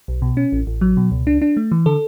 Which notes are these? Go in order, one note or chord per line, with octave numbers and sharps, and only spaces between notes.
B1
B2
C#4
A1
A1
F#3
B2
C#2
D4
D4
A3
E3
D3 A4